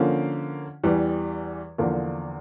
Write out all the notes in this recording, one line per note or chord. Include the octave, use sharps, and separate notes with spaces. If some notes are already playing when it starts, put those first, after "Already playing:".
Already playing: D3 F3 A#3 C#4
E2 E3 G3
E2 D3 F3 A#3 D4